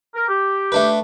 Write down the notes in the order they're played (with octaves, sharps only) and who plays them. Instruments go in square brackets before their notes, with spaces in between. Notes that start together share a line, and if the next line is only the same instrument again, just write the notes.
[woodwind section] A#4
G4
[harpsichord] A3 D4 B4